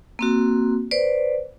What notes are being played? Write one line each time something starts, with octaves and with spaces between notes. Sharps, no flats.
A#3 C4 F#4
B4 C5 D5